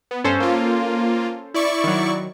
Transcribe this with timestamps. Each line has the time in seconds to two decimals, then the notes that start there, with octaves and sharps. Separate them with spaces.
0.11 B3
0.24 G2 C#4 A4 C5
0.40 A#3 F4
1.54 E4 D5 C#6
1.84 D#3 F#3